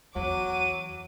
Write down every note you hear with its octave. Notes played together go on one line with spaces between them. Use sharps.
E2 F#3 D6 D#7